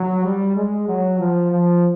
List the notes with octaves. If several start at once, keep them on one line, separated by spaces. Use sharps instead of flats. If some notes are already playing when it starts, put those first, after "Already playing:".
Already playing: F#3
G3
G#3
F#3
F3
F3